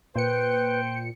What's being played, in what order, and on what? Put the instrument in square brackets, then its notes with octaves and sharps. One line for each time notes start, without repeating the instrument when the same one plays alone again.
[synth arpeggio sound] A#2 C#7 [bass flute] B4 [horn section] C5 G5